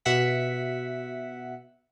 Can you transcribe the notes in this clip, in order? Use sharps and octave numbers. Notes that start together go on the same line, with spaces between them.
B2 E5 F#5 B6